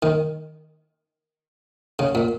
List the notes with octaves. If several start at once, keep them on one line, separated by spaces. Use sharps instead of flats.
D#3
C#3
A#2